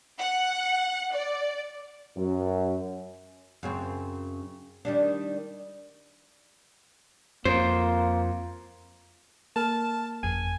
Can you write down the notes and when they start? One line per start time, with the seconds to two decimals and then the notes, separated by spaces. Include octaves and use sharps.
0.19 F#5
1.14 D5
2.17 F#2
3.63 F#2 C#3 C4
4.85 D#3 G3 D4
7.45 F2 A#3 C5
9.56 A#3 A#4 A5 F6
10.23 G1 F2 G#5